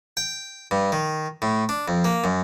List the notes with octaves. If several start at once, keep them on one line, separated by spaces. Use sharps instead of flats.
G5
G2
D#3
A2
D4
F2
A#3
F#2